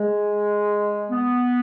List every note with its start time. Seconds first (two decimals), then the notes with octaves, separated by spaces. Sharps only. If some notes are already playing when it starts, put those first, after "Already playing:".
Already playing: G#3
1.11 B3